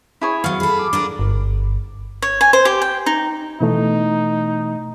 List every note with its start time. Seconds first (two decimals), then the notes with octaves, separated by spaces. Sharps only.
0.21 E4 G#4 C#5
0.44 F#3 B3 F5
0.60 G#4 A4 B5
0.79 D6
0.93 D4 F4 A#4
1.19 G1
2.22 C#5
2.41 G#5
2.53 C5
2.65 G4
2.82 G5
3.06 D#4
3.61 B2 E3 A3 D#4